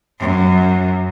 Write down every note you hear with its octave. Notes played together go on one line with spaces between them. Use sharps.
F#2